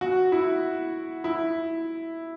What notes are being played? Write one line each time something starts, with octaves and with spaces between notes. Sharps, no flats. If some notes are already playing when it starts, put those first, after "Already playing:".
F#4
E4
E4